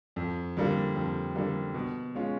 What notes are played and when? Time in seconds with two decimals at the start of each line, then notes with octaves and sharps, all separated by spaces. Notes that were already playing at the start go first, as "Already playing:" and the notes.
0.16 F2
0.57 D3 G3 A#3
0.95 F2
1.35 D3 G3 A#3
1.74 B2
2.14 G#3 C#4 F4